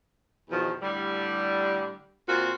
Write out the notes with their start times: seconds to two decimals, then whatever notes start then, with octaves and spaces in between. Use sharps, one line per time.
0.50 E2 B2 D#3 F3
0.82 A2 D3 G3
2.28 A#2 C4 F4 F#4